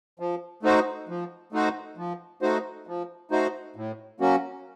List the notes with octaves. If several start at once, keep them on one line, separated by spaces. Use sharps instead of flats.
F3
A3 D#4 F#4 C5
F3
A3 D#4 F#4 C5
F3
A3 D#4 F#4 C5
F3
A3 D#4 F#4 C5
A2
F#3 A#3 C#4 F#4